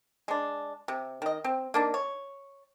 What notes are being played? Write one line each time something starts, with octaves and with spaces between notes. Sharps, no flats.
G#3 D4
C3
D#3 D#5
C4
A#3 D4 D#4
C#5